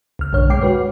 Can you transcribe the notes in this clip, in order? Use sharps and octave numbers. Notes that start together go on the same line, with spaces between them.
C#2 F6
B1 G2 D3 C#5 F6
G#3 G5 D6 C7
F#4 B4 C#5